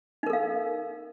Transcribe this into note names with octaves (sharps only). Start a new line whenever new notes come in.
D#4 A4 A#4 F5